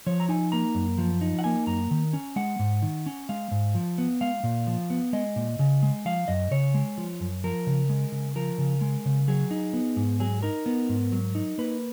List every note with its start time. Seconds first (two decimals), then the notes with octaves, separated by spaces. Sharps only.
0.06 F3 C#5
0.20 A#5
0.29 D#4 G#5
0.52 A#3 A#5
0.75 F#2
0.98 F3
1.21 D#4
1.39 F#5
1.44 A#3 G#5
1.67 F#2 A#5
1.91 D#3
2.13 C#4
2.36 G#3 F#5
2.59 G#2
2.82 D#3
3.06 C#4
3.29 G#3 F5
3.51 G#2
3.75 F3
3.98 B3
4.21 G#3 F5
4.43 A#2
4.67 F3
4.90 B3
5.13 G#3 D#5
5.36 A#2
5.59 C#3
5.83 G#3
6.05 F3 F5
6.28 F#2 D#5
6.51 C#3 C#5
6.74 G#3
6.98 F3
7.20 F#2
7.44 F3 A#4
7.67 C#3
7.89 G#3
8.12 C#3
8.36 F3 A#4
8.58 C#3
8.81 G#3
9.05 C#3
9.28 F#3 G#4
9.51 D#4
9.73 B3
9.96 G#2
10.20 F#3 G#4
10.43 D#4 A#4
10.66 B3
10.89 G#2
11.12 F#3
11.35 D#4
11.58 A#3 B4